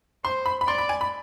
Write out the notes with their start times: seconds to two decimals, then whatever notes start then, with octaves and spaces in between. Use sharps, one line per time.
0.24 C5 C6
0.46 B5
0.61 B5
0.67 D5 C6
0.78 B5
0.89 G#5
1.01 B5